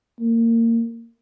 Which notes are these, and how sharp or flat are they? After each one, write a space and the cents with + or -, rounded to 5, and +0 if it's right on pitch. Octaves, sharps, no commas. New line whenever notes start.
A#3 -25